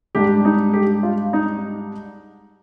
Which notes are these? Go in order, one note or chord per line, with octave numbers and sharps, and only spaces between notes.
G#2 G3 D4 G4
D#4
G4
F4
D#4